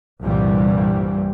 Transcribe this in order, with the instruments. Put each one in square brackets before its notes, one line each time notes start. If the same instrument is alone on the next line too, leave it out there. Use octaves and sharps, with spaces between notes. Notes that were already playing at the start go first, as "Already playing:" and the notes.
[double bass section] C2 G2 A#2 E3 G3